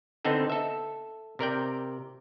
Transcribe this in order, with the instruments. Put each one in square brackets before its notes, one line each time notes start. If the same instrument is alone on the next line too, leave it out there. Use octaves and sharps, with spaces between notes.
[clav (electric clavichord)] D3 B3 C4 D#4 A4
A4 E5
C3 A#4 D5 G5